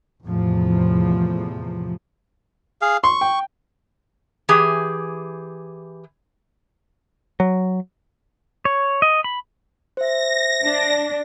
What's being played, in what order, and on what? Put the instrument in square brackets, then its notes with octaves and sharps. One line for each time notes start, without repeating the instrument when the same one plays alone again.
[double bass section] E2 A2 C3 F3
[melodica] G#4 F5
[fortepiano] C6 [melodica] C#6
[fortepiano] G5
[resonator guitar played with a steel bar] E3 G4 G#4
[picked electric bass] F#3
[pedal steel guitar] C#5
D#5
B5
[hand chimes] C5 E5 [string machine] A#6
[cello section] D4